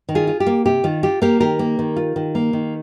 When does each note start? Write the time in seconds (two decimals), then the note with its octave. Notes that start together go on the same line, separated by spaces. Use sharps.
0.09 D#3
0.15 F4 G#4
0.27 F4
0.40 G4
0.46 A#3
0.66 C3 G4
0.84 D#3 F4
1.03 F4 G4
1.22 A#3 G4 A#4
1.40 D#3 G4 A#4
1.59 A#3
1.79 D#3
1.96 F4
2.16 D#3
2.35 A#3
2.53 D#3